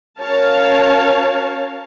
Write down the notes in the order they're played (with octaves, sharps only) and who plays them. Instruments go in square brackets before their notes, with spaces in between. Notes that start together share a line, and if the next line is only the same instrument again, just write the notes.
[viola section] C#4 F#4 A#4 C#5 F5 A5